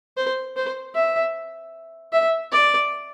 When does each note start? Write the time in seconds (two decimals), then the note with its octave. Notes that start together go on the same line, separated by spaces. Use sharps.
0.17 C5
0.56 C5
0.95 E5
2.12 E5
2.52 D5